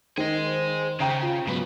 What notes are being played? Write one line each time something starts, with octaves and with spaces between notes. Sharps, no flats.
D#3 G#4 C5 D#5
C#3 G5 A#5
F4
G#2 F#3 B3